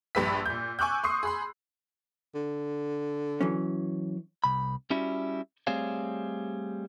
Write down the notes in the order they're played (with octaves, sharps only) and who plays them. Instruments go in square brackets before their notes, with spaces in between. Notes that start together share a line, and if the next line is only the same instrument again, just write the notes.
[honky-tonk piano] A#1 G2 G4 B4 E6 B6
A#2 G6
G#5 C#6 D6 E6 F#6 G6
C6 C#6 D#6 C7
G#4 B5 C6
[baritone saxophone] D3
[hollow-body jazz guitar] E3 F#3 C#4
[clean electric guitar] C2 B5
G3 C#4 E4 F#4
G3 A3 C4 G#4 C#5 F5